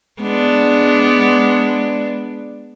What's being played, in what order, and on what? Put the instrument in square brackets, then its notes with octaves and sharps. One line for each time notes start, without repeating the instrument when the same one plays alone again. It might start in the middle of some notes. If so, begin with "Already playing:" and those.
[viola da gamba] G#3 B3 D4